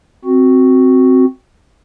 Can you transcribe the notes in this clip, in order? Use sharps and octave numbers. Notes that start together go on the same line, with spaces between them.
C4 F#4